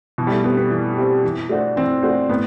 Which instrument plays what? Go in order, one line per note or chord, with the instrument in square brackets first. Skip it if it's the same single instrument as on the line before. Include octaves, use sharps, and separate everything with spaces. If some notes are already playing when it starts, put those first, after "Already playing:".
[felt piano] B2 [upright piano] E3
[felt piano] G3
A3
[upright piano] G3 C4 [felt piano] B3
[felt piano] B3
[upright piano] E3
G3 C4
E3
A3 D4 F#4 C5
[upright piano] E3 [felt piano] C4
[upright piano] A3 D4 F#4 C5
[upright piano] A2 [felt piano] B3